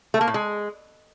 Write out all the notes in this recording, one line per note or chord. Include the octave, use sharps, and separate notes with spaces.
A3
A#3
A2
G#3